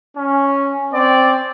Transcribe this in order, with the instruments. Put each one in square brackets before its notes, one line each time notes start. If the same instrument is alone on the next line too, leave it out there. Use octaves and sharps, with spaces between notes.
[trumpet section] C#4
C4 D5